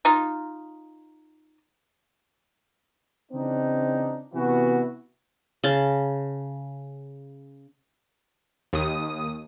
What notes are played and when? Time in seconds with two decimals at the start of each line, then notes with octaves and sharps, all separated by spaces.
0.05 D#4 F4
3.32 C#3 E3 C4 D4 D#4
4.34 C3 E3 B3 E4 F#4
5.64 C#3 A5
8.73 D#2 D#6